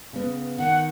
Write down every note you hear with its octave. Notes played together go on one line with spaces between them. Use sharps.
C#3 B3
D#3 F#5